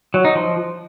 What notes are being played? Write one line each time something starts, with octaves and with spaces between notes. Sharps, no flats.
F#3
D#4
F3